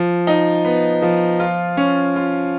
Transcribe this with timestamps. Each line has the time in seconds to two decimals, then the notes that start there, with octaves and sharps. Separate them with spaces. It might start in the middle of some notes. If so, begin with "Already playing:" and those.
Already playing: F3
0.27 D#4
0.65 B3
1.02 F3
1.40 F4
1.77 C#4
2.16 F4